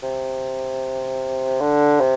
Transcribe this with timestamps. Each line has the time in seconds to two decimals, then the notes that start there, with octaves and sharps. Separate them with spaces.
0.03 C3
1.61 D3
2.00 C3